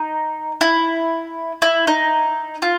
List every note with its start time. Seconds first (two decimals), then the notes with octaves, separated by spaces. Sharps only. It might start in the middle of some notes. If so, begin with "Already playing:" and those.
Already playing: D#4
0.61 E4
1.62 E4
1.87 D#4
2.62 F4